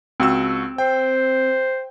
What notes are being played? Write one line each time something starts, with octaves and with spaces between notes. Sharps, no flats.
C#2 C4 F#4 E6
C5 G5